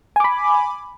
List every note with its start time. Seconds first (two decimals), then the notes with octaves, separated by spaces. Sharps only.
0.16 G#5
0.20 D6
0.24 B5